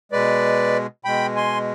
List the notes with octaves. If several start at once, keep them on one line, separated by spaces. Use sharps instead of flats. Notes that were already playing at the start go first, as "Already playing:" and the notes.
B2 G#3 B4 D5
B2 G#3 G5 B5
G#5 C6